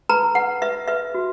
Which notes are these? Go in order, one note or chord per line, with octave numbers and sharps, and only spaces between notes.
B4 A#5
B4 F#5
B4 E5
B4 E5
F#4